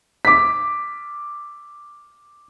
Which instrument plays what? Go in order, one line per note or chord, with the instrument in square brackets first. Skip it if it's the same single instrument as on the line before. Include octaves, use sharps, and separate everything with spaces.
[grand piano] D6 B6